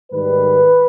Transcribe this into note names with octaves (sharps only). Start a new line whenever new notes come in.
G#2 D#3 G3 B4